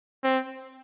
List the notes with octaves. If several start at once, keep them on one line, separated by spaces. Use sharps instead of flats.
C4